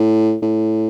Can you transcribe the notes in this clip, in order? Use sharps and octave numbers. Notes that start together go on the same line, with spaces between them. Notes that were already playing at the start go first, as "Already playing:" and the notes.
Already playing: A2
A2